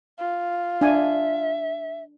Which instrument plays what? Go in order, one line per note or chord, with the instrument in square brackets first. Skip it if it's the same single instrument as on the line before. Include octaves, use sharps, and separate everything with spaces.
[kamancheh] F4
[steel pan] D4 G#5 [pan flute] E5